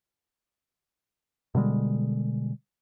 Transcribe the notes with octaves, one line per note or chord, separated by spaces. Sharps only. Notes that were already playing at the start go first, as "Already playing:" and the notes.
B2 D3 G3 G#3